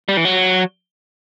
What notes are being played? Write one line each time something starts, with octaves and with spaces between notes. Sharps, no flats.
G3
E3
F#3